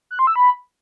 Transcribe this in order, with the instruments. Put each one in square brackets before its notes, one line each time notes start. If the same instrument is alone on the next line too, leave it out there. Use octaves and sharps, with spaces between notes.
[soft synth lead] F#6
C6
E6
B5